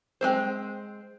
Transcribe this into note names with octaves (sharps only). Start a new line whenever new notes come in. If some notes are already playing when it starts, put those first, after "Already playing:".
G#3 C4 C5